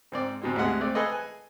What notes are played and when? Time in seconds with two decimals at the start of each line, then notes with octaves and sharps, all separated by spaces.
0.12 G#2 C4 D5
0.42 G#2 B2 C4
0.56 D2 C3 G#3 F#5
0.81 A3 C4 D5
0.95 G#4 A4 B4 D#5
1.12 G#5